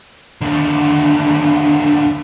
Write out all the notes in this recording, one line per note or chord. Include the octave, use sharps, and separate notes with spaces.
D#2 D3